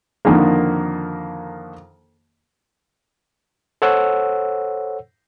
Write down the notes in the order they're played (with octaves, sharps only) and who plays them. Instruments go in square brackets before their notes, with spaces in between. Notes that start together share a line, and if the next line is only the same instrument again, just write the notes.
[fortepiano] F2 D3 D#3 A#3
[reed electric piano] A4 C5 C#5 F#5 E6